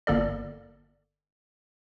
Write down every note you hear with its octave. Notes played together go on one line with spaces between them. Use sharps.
G1 A#3 A4 D5